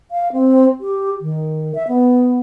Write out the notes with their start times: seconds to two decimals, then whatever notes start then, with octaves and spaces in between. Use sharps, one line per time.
0.11 F5
0.32 C4
0.80 G4
1.21 D#3
1.75 E5
1.88 B3